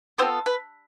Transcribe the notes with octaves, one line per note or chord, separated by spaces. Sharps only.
B3 C4 F4 A4 C5
B4